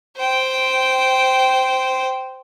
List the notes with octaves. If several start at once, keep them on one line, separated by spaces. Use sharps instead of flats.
C5 G5